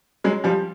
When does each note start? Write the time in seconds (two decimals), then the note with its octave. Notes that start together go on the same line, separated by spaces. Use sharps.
0.24 F#3 G#3
0.44 F3 G3